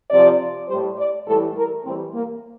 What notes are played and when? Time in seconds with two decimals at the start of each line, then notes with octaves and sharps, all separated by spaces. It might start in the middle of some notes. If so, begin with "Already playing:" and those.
0.10 C3 F3 D5
0.68 A2 G3 C5
0.97 D5
1.27 A2 E3 G3 A4
1.56 A#4
1.84 A2 E3 G3 C4
2.14 A#3